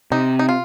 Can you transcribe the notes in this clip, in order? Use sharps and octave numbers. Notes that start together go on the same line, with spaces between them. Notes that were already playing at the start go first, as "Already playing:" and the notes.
C3 D#4
D#4
F4